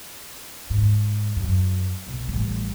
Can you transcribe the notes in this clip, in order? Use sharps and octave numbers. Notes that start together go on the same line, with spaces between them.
G#2
F#2
B1
A1 G3